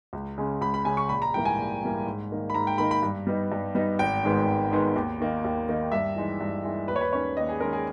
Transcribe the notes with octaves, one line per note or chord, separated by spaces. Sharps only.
C#2
C#3 G#3 C#4
C#2 B5
B5
C#3 G#3 C#4 G#5
C#6
A#1 B5
A#5
G#2 E3 G3 A#3 G5
G#5
A#1
G#2 E3 G3 A#3
G#2
D#3 A#3 D#4
B5
G#2 A#5
G5
D#3 A#3 D#4 B5
B5
G2
G3 B3 D#4
G2
G3 B3 D#4
G#1 G5
G#2 D#3 G#3 B3
G#1
G#2 D#3 G#3 B3
D#2
D#3 A#3 D#4
D#2
D#3 A#3 D#4
G2 E5
E3 G#3 D#4
G2
E3 G#3 D#4
D#2 B4
C#5
B4
D#3 G#3 C#4 C#5
D#2 D#5
G#4
D#3 G#3 C#4 A#4
G#4